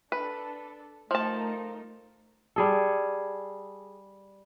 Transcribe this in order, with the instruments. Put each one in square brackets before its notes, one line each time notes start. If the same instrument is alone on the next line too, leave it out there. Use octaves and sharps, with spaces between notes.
[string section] D4 A4 [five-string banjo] B4
[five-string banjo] F3 A5 [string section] A3 D#4 A#4
[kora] G3 G#4 A4